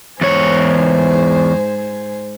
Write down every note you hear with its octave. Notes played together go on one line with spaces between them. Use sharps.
E2 G#2 C5 C#5 G#5